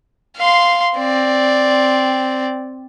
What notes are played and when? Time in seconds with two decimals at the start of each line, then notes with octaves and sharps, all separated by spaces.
0.37 F5 C6
0.97 C4 D5